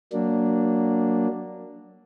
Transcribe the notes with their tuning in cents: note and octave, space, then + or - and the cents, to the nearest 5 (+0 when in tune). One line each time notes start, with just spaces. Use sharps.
F#3 +10 A#3 +0 D4 +0